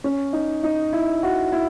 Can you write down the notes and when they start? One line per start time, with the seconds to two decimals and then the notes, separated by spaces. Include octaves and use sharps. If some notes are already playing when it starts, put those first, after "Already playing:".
0.04 C#4
0.33 D#4
0.63 D#4
0.93 E4
1.23 F#4
1.52 E4